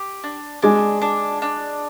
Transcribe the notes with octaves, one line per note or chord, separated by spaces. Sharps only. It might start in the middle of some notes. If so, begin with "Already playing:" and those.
Already playing: G4
D4
G#3 D4
D4
D4